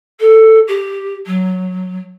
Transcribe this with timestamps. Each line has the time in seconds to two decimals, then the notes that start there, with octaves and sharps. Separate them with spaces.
0.20 A4
0.67 G4
1.26 F#3